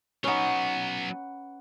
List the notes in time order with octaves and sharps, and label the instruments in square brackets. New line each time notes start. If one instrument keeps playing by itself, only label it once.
[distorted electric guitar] F#3 B3 [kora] C#4 D#4 [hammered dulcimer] B4 F#5